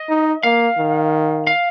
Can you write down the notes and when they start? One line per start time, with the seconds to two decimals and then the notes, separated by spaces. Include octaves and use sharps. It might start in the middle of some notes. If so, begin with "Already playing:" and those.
Already playing: D#5
0.09 D#4
0.43 A#3 F5
0.78 D#3
1.47 F5